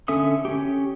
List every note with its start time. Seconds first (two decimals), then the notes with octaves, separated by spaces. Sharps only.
0.08 D3 C#4 A4 E5 D#6
0.45 C#4 G4